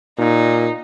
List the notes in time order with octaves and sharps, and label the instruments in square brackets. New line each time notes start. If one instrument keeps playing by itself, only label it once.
[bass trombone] A#2 [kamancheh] D#4